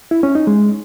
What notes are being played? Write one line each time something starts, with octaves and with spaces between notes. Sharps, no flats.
E4
C#4
D#4
G#3